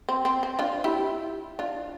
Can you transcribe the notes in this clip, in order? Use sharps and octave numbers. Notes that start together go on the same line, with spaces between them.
C4
C4
C4
D4 F4
E4 G4
D4 F4